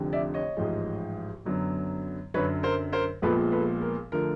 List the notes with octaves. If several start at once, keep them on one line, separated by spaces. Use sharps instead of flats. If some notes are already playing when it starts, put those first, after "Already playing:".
Already playing: F1 F2 D3
D5 E5
C#5 D#5
A1 G#2 F3 G#3
F#2 D3 F#3 B3
F#2 D3 F#3 B4 C#5
A#4 C5
A#4 C5
A#1 A#2 F3 G#3 B3 A4 B4
A4 B4
A#4
D3 F3 A3 A#4